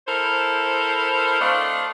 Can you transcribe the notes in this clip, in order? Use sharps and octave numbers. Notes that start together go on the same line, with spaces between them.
E4 A4 A#4 C5
A3 C4 D4 D#5 F5